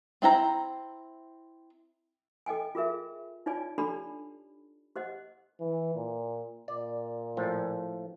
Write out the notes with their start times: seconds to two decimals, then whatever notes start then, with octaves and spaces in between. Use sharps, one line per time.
0.22 C4 E4 G5 A#5
2.46 A4 D#5 G5 G#5
2.75 F4 G#4 A#4 E5
3.46 D#4 F4 C#5 D5 G#5
3.78 D4 G4 A4 D5 A5 B5
4.96 G4 C5 D#5 F#5
5.60 E3
5.95 A#2
6.68 A#2 D5
7.37 A2 F3